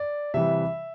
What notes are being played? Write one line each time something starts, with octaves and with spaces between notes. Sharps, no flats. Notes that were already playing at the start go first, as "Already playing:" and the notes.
Already playing: D5
C3 E3 G3 E5